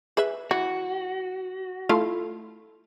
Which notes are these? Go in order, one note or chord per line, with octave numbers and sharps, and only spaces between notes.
G#4 B4 E5
E3 F#4
A3 E4 F4 F5